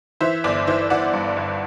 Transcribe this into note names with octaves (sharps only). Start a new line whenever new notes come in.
E3 C5 E5
G1 D5
E3 C5 E5
E3 D5 F#5
G2
G1